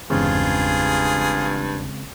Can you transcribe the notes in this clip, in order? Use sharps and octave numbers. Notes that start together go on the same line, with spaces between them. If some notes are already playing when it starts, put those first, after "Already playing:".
G1 E2 G2 C#3 G#3 C4 F4 G#4